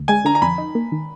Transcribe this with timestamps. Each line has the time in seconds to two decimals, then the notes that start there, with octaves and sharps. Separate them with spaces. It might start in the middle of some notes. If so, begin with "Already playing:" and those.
Already playing: D2
0.08 G#3 G#5
0.25 D3 A#5
0.35 A#5
0.42 F2 B5
0.58 D#4
0.75 A#3
0.92 D#3